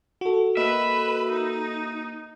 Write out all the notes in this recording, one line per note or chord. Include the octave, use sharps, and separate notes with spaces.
F#4 A4
A#3 B4 D#5 E5
D#4